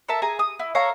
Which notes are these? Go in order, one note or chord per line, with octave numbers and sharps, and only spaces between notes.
A4 A#4 E5 A5
G#4 G#5 A#5
D#6
E4
A4 C#5 F5 A#5